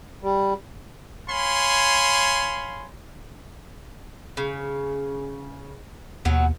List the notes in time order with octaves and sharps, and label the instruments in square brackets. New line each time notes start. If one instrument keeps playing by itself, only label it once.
[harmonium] G3
[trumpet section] C#5 F5 G#5 B5 C6
[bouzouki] C#3
[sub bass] D#2 [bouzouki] B2 F#3